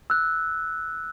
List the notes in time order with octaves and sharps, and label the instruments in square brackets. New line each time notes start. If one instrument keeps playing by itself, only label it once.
[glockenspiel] E6 F#6